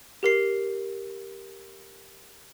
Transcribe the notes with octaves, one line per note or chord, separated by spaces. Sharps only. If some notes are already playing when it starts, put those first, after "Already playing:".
G4 A#4 C7